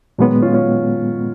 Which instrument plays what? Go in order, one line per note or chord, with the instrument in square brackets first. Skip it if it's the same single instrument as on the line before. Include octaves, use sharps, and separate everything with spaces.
[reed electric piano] A#2 G#3 B3 [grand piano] D#3 F#3
[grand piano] C#4 F4
C#4 F4